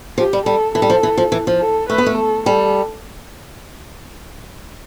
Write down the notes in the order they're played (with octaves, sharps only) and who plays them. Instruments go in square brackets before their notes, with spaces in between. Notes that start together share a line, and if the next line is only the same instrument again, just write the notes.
[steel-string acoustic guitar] F3 [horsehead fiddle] G4
[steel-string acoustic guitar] G3
[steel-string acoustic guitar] G3 [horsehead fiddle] A4
[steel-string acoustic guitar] E3 [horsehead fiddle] A4
[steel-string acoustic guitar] G3
F3
E3
F3
E3
F3
[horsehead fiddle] A4
[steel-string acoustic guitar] A3 [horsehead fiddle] B4
[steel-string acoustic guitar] B3
A3
[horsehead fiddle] A4
[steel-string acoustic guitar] G3 [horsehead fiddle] A4